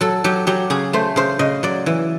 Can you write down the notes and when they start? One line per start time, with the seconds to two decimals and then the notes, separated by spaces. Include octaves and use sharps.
0.01 F#3 A4
0.24 F#3 G4
0.47 F#3 G4
0.70 C#3 G#4
0.93 A3 C5
1.16 C#3 C5
1.39 C#3 D#5
1.63 F#3 D5
1.86 E3